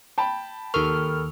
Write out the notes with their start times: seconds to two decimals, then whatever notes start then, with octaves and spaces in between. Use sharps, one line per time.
0.18 G5 A5 B5
0.74 D#2 A4 A#4 C#6 F6